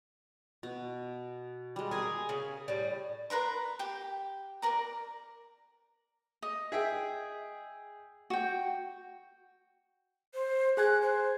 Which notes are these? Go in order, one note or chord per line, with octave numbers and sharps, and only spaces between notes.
B2
G3 G#3
G#4 A#4 G#5
C#3
A2 G3
A#4 B4 A#5 C6
G4 G5
A#4 D5 A#5
D#5
G#4 E5 G5
F#4 G5
C5
G#4 G#5 F#6 G#6
C5